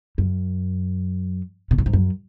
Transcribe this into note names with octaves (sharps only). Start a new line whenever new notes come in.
F#2
B2
A2
G#2
F#2